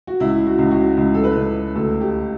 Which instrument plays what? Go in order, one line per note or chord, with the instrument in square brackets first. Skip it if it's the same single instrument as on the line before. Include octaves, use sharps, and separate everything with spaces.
[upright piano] F#4
C#2 E4
F#4
C#2
F#4
C#2
A4
B4
C#2
D2 A4
G4